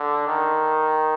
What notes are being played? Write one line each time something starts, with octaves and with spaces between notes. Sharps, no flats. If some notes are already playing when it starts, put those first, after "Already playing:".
Already playing: D3
D#3